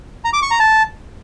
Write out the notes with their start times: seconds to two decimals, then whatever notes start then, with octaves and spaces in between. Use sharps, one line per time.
0.24 A#5
0.33 D6
0.42 C#6
0.51 A#5
0.60 A5